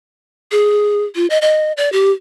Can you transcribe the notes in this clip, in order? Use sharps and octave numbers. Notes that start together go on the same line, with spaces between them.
G#4
F4
D#5
D#5
D5
G4